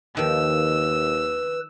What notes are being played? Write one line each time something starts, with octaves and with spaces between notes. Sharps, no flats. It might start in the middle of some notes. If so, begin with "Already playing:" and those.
D#2 D#3 F3 B4 E6